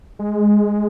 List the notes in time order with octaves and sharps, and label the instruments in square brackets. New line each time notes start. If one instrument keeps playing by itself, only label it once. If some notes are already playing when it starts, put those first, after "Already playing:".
[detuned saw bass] G#3